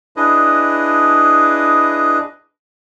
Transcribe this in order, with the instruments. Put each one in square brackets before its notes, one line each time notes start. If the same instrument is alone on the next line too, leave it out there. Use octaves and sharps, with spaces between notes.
[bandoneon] D4 E4 G#4 B4 D#5